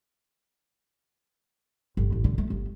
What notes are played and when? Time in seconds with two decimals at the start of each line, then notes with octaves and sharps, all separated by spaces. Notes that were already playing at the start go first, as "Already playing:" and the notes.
1.97 G1
2.12 A1
2.24 D3
2.38 A3
2.50 G1